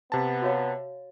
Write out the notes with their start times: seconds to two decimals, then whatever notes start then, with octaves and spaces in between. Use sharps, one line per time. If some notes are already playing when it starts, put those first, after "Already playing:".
0.12 C3 B3 A5
0.42 F#4 C#5 F5